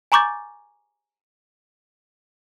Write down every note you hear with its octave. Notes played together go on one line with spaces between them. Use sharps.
G#5 A#5 C#6 D6 G6 A6